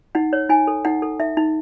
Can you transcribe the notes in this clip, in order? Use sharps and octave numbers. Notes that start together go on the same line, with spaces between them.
D#4 F#5
C#5
D#4 G#5
A4
D#4 F#5
A4
D#4 E5
D#4